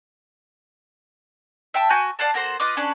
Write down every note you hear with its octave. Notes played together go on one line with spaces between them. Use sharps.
E5 G5 A5
F#4 G#5 G6
D5 F5 F#5 A5
A#3 F#4 A4 C5
F4 B4 D#5 D6
C#4 D4 B4